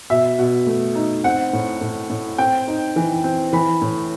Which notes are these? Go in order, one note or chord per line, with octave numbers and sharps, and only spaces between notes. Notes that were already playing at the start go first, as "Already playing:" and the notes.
B2 E5
B2
A3
D#4
C4 F#5
A2
A2
A2
C4 G5
D#4
E3
C4
E3 B5
A2